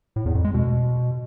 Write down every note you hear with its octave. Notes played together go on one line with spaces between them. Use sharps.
A2
E2
F2
G#3
B2